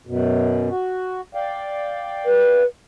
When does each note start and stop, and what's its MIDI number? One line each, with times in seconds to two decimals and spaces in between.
0.07 0.69 42
0.07 0.69 47
0.70 1.21 66
1.35 2.62 74
1.35 2.62 77
1.35 2.62 79
2.26 2.65 71